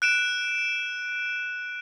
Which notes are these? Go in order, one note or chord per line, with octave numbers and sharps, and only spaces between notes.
F#6 D7 E7